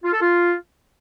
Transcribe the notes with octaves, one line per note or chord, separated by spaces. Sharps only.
F4
A4
F4